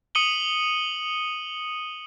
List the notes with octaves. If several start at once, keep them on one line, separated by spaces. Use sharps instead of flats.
D#6 C#7 D#7 F#7 G7